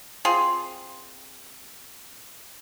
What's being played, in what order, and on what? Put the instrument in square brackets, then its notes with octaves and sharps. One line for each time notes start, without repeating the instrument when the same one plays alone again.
[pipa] C4 F4 G#4 C6